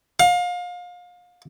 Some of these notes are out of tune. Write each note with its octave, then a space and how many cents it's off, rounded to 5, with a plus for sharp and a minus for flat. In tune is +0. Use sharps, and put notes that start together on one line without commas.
F5 +30